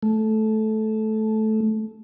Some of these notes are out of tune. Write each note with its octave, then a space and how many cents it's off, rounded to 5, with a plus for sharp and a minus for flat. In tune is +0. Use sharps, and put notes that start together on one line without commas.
A3 -15